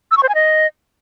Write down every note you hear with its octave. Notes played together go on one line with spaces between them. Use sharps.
E6
C#6
C5
G#5
D#5